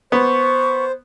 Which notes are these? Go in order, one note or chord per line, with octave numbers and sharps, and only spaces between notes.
B3 C5 C#6